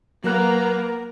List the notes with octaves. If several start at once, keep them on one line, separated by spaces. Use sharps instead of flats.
F#3 A#3 B3 A#4 A#5 F#6